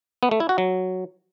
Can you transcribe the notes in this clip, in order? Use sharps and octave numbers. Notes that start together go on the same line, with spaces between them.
B3
A3
E4
F#4
F#3